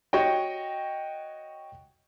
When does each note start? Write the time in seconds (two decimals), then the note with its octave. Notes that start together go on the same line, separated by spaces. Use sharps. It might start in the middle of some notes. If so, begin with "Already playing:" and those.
0.13 F#4 C#5 D#5 G5